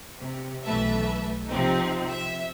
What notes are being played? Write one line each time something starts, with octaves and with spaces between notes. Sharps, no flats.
C3
B1 E3 A3 B4 E5 A5
C3 F3 C4 D#4
E5